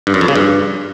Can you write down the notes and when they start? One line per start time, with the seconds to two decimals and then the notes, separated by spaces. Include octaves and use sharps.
0.07 G2
0.14 F#2
0.21 F2
0.28 C#3
0.35 G2